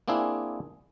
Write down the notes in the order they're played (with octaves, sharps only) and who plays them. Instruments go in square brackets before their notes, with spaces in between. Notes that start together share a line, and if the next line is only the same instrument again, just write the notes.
[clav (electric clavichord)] A#3 C4 D4 E4 G#4